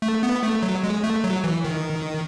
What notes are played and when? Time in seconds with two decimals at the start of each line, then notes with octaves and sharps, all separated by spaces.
0.02 A3
0.23 B3
0.43 A3
0.63 F#3
0.84 G#3
1.04 A3
1.24 F#3
1.44 E3
1.65 D#3